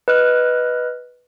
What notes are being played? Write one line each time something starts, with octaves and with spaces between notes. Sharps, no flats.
B4 D#5 F6 F#6